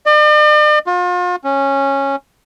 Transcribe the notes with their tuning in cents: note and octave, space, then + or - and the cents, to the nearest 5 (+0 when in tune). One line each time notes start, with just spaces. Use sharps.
D5 +45
F4 +40
C#4 -10